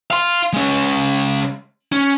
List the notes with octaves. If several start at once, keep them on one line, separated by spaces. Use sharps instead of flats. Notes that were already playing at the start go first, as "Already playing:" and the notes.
F5 C6
G#3 C#4
C#4